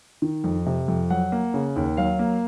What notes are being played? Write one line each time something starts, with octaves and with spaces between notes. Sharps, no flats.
D#3
F2
C3
F2
F#3 F#5
A#3
C#3
D#2
F#3 F5
A#3